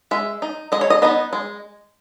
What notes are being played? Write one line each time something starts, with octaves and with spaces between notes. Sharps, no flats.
G#3 E5
D#4
G#3 D#5
C#5
D#5
B3 D#4 D#5
G#3